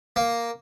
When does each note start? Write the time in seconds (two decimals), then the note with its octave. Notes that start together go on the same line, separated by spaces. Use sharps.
0.16 A#3